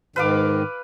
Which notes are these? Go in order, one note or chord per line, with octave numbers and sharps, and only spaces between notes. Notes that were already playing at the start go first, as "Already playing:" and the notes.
G#2 D#3 B4 F5 D6